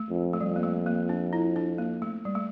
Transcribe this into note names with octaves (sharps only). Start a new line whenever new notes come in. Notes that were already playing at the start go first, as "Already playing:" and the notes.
Already playing: A3
F2
A3
F2 G3
A#3
A3
A#3
D4
E4
D4
A#3
A3
G3
A3